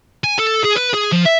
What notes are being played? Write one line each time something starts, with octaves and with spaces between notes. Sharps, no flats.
G#5
A4
G#4
B4
G#4
F3
E5